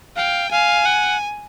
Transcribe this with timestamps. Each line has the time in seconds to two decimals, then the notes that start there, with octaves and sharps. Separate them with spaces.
0.16 F5 G5
0.51 F5 G#5
0.85 F#5